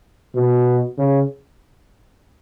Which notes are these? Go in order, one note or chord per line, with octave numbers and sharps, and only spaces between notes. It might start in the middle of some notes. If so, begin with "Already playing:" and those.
B2
C#3